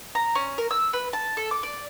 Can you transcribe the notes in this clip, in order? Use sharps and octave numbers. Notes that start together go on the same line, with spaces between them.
A#5
C#4
A#4
E6
B4
A5
A4
D6
D5